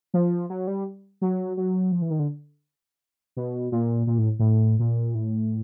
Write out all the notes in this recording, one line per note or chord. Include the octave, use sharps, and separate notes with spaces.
F3
F#3
G3
F#3
F#3
F3
E3
D#3
D3
B2
A#2
A#2
A2
A2
A#2
A2